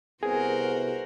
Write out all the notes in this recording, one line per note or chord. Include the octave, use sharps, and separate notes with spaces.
C2 C3 B3 F#4 G#4 A#4 C5